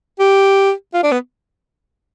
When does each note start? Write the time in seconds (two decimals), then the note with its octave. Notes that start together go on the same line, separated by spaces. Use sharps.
0.19 G4
0.94 F4
1.03 D4
1.11 B3